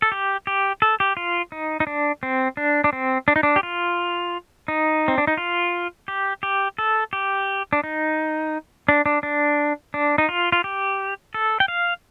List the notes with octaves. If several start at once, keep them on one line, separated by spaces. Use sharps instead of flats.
A4
G4
G4
A4
G4
F4
D#4
D#4
D4
C4
D4
D4
C4
D4
D#4
D4
G4
F4
D#4
C4
D4
D#4
F4
G4
G4
A4
G4
D4
D#4
D4
D4
D4
D4
D#4
F4
F4
G4
A4
G5
F5